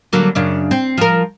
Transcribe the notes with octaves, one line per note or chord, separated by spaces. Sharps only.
D3 F#3 A#3
F#2 C#3 D4
C4
F3 A#4